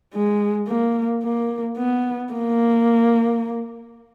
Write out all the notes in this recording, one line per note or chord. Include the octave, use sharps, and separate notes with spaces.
G#3
A#3
A#3
B3
A#3